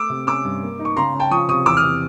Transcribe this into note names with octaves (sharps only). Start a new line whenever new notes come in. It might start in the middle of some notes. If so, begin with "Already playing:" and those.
Already playing: A3 D6 E6
C3
C#4 D6 E6
G2
A#3
D#4
C#6
C#3 A#5 C6
C#3
G5 A5
F3 C#6 D#6
C3 C#6 D#6
E2 D6 E6
D#6 F6
C3